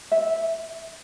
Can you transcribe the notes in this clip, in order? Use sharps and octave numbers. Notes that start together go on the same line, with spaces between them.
E5